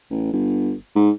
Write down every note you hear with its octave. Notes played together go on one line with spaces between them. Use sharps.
A1
G1
G#2